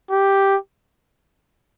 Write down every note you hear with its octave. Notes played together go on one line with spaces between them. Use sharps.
G4